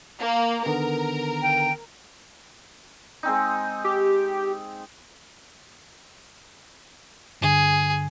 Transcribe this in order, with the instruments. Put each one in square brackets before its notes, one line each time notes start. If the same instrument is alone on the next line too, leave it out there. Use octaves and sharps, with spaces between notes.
[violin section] A#3
[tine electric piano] D3 D#3 B3 [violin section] A#4
[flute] G5
[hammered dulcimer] G#3 C4 D#4
[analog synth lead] G4
[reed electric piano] G2 D3 [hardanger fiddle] G#4